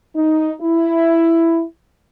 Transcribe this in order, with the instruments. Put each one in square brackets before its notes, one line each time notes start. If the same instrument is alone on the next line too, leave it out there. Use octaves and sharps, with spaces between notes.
[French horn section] D#4
E4